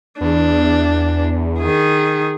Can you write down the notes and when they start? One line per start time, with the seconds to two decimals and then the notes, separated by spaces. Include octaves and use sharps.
0.21 E2 D4
1.59 D#3 G#4